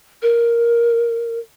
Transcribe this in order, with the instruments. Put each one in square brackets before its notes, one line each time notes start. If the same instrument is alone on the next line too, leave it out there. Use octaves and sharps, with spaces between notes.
[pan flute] A#4